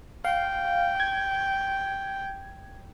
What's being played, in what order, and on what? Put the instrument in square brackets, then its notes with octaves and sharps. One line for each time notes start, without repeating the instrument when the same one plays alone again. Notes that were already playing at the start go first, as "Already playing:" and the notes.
[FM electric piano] F5 [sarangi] G5
[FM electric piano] G#6